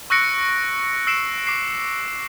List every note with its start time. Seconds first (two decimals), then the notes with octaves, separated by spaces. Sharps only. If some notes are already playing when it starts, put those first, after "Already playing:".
0.10 C#6 E6 F#6 A#6 C#7 D7
1.07 E6 C7 D7 E7
1.47 D6 C7